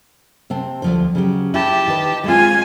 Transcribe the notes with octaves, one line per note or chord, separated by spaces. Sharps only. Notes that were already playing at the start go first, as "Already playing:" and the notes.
C3 C4 A5
D2 F3 C5
C#3 F#3 G4
E4 G4 A5
D#3 B4
G#3 C4 F4 G#5